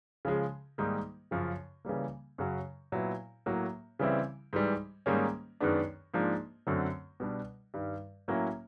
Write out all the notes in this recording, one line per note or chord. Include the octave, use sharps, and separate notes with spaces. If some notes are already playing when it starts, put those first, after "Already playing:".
C#3 F3 G#3
G#2 D#3 G3 A#3 D#4
F#2 C#3 F3
C#3 E3 G3 A#3
F#2 C#3 F#3
A#2 F#3 B3 E4
A2 F#3 A#3
C#3 E3 G3 C4 E4
G#2 E3 G3
G#2 D#3 G3 A#3 C#4
F#2 D#3 G#3 B3 D4
G#2 F3 A#3 D4
F#2 D3 F#3 A3 C4
B2 G3 B3 D4
G2 D#3 G3
A2 F#3 A#3 C#4 E4